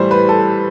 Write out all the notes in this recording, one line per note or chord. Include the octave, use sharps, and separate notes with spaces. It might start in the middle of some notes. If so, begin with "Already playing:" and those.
Already playing: A2 E3 G3 C5
B4
A4